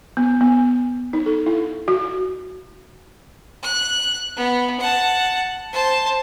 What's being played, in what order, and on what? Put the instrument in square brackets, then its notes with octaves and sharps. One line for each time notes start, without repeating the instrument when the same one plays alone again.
[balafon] B3
B3
D#4
A4
E4
F#4
[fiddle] F#6
B3
F#5 A5
C5 A5